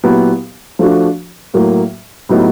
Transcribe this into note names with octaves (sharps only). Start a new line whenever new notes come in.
A#2 F#3 B3 E4 G4
F3 A3 D4 F#4
A2 F#3 A#3
A2 F#3 B3 D#4 G4